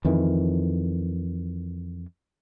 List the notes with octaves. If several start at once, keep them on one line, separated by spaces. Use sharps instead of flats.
F2 D#3 E3